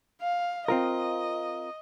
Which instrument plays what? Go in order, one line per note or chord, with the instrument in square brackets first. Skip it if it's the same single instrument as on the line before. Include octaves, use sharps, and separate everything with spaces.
[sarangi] F5
[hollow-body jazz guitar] C4 F4 A#4 [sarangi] D#5